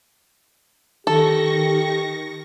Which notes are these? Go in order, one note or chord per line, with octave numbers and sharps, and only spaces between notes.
D#3 G4 A4 C#6 A#6